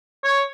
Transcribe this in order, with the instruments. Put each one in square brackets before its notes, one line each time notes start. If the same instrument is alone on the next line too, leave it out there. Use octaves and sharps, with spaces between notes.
[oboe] C#5